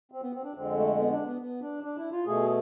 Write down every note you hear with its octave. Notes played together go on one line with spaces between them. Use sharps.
C4
B3
C4
D4
F2 D3 G#3 C4
A3
B3
D4
B3
B3
D4
D4
E4
F4
B2 A3 G#4